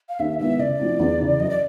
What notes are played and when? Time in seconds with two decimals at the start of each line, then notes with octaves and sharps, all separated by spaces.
0.09 F5
0.19 D#2 E5
0.39 D#3 G#3 B3 E4 E5
0.59 C#3 D5
0.79 F3 A3 C4 E4
1.00 E2
1.20 C#3 E3
1.40 F#2 D#5
1.50 D5